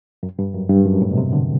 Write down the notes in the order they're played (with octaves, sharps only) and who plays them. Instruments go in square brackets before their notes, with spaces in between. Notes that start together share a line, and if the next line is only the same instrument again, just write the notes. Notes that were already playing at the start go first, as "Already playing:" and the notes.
[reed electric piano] F#2
G2
F#2
G2
F#2
A2
B2
C3
D3